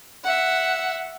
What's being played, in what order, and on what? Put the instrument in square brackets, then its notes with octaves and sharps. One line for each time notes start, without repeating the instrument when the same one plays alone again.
[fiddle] E5 F#5